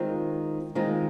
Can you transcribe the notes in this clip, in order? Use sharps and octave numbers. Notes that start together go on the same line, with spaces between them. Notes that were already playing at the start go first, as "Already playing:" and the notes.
Already playing: D#3 G#3 C4 F4
D#3 G#3 C4 F4